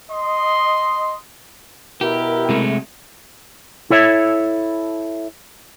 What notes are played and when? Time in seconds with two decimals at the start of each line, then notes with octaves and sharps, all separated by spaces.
0.11 D#5 C6
2.01 B2 E4 G4 A#4
2.49 C3 G#3 A3
3.90 E4 A4 C#5 E5